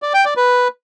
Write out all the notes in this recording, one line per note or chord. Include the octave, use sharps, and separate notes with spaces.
D5
G5
D5
B4